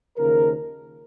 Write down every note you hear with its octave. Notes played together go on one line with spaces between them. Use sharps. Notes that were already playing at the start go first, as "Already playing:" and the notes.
D#2 C#3 F3 A#4